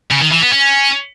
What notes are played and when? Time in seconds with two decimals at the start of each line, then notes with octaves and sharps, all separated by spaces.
0.11 C#3
0.22 D#3
0.32 E3
0.42 B3
0.52 C#4